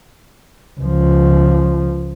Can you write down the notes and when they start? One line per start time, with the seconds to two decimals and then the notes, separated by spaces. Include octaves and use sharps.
0.80 C#2 F3